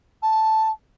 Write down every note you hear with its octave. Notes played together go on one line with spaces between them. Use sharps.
A5